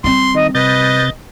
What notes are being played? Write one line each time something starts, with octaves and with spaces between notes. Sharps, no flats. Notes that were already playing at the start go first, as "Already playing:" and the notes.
G3 C4 C6
D#3 D#5
C3 B4 D#5 G6 A6